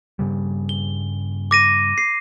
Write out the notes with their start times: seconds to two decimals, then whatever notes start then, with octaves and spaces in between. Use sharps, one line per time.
0.19 G2 C#3 G3
0.69 G7
1.51 D6 A#6 D#7
1.98 C7